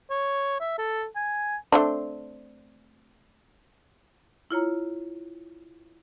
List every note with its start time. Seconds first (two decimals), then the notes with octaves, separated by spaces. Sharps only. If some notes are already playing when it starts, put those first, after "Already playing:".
0.10 C#5
0.60 E5
0.78 A4
1.15 G#5
1.72 A3 C4 D4
4.51 E4 F4 C#5 A#5